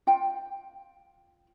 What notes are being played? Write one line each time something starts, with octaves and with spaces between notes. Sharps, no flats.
F4 G5